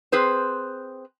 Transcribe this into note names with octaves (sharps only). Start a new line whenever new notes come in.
C4 G#4 B4 C5